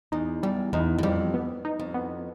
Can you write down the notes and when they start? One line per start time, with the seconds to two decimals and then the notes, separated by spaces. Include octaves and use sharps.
0.12 E2 D#4
0.43 E2 G3
0.73 E2 D#4
0.99 F#2
1.03 F2 G3
1.34 B3
1.65 D#4
1.80 F2
1.94 B3